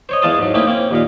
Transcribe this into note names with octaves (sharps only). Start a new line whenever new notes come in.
C5 C#5 D#5
E2 G#3 F5 A5 C6 D#6
G#2 F#3
A3 A#3 C4 C#4 D#4 E4
A#3 C4 C#4
D#2 A#2 F5